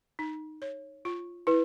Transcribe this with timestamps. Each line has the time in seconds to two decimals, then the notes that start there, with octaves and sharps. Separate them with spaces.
0.19 D#4
0.62 C#5
1.05 F4
1.47 E4 B4